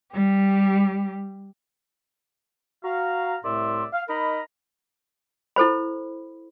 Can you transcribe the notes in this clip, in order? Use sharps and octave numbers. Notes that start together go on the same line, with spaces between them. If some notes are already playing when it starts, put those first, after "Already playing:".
G3 G4
F#4 F5 A#5
C2 A2 A3 D5 E5 C6
F5
D#4 A#4 D#5 A#5 B5
E4 A4 C5 B5